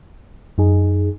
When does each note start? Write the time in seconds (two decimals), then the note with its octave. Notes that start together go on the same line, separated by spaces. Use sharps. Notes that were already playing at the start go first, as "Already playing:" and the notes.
0.58 F#2 D#4 G#4